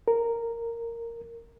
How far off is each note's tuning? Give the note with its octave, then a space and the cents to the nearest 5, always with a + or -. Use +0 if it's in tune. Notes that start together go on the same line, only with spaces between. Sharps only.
A#4 -10